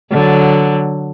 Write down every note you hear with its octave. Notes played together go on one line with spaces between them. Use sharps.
D3 F#3